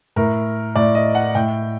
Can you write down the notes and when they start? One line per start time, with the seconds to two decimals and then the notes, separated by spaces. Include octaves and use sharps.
0.16 A2 A#4
0.75 A2 D5
0.95 D#5
1.15 F#5
1.35 A2 G5